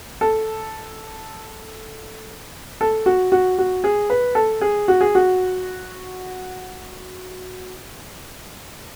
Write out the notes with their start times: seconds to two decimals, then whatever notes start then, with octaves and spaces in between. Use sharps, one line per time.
0.21 A4
2.81 A4
3.06 F#4
3.32 F#4
3.58 F#4
3.84 G#4
4.10 B4
4.35 A4
4.61 G#4
4.88 F#4
5.01 G#4
5.15 F#4